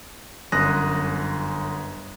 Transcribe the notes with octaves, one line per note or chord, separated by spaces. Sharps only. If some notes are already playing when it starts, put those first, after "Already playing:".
G1 F#2 D#6 F#6 A#6